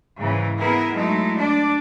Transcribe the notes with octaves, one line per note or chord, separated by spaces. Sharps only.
G#2 C#3 E3
B3 E4 G#4 A#4 B4
F#3 G#3 A3 D#4 E4
D4 D5